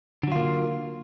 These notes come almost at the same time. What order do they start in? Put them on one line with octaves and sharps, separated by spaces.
D3 F#3 F4 A#3